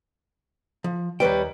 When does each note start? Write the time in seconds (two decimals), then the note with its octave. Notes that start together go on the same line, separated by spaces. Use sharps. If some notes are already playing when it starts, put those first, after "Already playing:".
0.84 F3
1.20 D#2 G3 B4 C#5 G5